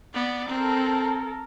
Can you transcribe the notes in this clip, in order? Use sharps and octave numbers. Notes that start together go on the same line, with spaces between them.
B3 D5
C4 A4 A#4